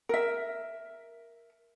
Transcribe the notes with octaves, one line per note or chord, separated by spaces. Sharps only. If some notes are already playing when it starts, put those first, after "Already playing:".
A#4 E5